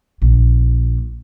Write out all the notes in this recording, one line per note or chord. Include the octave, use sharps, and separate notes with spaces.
A#1